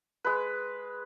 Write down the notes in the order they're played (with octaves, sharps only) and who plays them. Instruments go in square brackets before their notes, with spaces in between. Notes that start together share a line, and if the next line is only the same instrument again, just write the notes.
[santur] G#3 B4